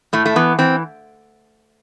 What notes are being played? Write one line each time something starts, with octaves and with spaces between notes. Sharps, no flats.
A2 A3
A3
E3 B3
E3 C4